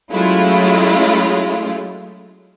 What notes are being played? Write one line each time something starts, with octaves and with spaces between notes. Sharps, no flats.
F#3 G#3 A3 C#4 E4 F4